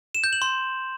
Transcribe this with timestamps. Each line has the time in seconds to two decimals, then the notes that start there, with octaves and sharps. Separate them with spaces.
0.15 E7
0.24 G6
0.33 F#7
0.42 C6